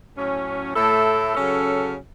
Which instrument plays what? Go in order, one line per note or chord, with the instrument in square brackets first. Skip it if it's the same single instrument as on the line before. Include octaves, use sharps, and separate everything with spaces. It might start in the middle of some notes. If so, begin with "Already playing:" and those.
[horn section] A2 F#3 C#4
A2 A3 E4 A4
C#3 F#3 C#4 A4